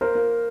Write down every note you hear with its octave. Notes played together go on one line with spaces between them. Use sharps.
A#3 A#4 C5
A#3